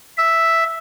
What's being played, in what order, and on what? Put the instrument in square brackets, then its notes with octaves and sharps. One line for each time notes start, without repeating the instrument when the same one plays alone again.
[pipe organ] E5